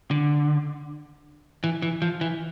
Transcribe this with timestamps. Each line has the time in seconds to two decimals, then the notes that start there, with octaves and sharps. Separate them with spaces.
0.11 D3
1.64 E3
1.82 E3
2.02 F3
2.21 E3